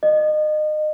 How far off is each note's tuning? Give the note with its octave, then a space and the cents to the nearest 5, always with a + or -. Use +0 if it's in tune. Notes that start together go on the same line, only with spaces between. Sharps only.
D#5 -30